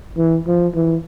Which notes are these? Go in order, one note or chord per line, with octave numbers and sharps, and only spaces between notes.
E3
F3
E3